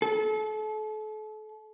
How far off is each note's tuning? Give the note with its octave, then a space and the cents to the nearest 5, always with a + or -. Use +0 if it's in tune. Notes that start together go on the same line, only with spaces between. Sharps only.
A4 -35